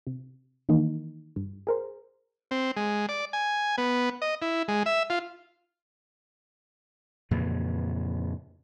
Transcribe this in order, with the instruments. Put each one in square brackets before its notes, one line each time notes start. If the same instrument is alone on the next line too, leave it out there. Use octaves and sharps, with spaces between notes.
[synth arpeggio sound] C3
D#3 E3 A#3 D#4
G2
G#4 A#4 C5
[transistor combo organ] C4
G#3
D5
G#5
B3
D#5
E4
G#3
E5
F4
[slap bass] F2 A#2 C#3 E3